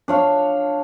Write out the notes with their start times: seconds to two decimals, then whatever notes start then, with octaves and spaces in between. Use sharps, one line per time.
0.08 D4 C#5 F5